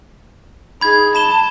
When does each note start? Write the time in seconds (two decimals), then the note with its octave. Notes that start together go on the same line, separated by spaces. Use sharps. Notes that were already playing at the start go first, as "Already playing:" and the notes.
0.81 D#4 G#4 B5 G#6
1.15 A5 B5 E7 G7